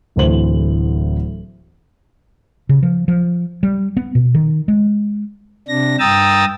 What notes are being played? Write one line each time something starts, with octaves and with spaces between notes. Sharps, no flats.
D1 D2 E3 C5 F#7
C#3
F3
F3
G3
B3
B2
D#3
G#3
C3 D4 A#6
G2 G5 A#5 D#6 E6 A6